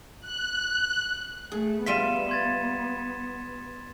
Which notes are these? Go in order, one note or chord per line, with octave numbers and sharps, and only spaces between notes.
F#6
A3 G#4
G3 B3 F4 E5 B6 D#7 E7
C6 G#6 A6